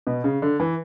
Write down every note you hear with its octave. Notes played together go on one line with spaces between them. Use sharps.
B2
C#3
D3
E3